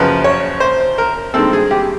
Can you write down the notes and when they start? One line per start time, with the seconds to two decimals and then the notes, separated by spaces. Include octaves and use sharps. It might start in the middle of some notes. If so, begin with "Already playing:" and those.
Already playing: F#2 C#3 F3 B4
0.24 C#5
0.60 C5
0.98 A#4
1.34 G2 D#3 G#3 C4 A4
1.53 G#4
1.71 G4